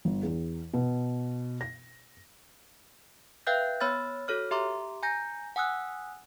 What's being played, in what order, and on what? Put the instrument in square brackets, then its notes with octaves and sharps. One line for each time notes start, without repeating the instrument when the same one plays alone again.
[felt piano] G1
E2
B2
A#6
[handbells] B4 E5 F5 G5 F#6 G6
B3 C#5 B5 E6 F6 A6
F#4 A4 C#5 F6
G4 E5 A#5 C6 D6
G#5 A#5 G6 A#6
F#5 G#5 D#6 E6 F#6